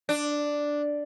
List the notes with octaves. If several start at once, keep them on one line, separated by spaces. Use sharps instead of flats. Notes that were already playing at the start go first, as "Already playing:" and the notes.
D4